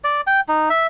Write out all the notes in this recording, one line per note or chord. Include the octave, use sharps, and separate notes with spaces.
D5
G5
D#4
E5